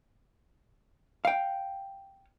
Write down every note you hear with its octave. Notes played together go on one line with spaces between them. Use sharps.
F5 G5